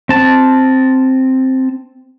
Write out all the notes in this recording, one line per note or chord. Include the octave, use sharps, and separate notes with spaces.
C4 A5